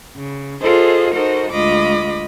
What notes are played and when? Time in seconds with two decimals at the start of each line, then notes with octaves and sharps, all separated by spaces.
0.17 C#3
0.61 F4 G#4 A4 C5 D#5
1.14 D#4 F#4 A4 A#4 C5 D#5
1.51 D2 G#3 F4 D#5 B5 D6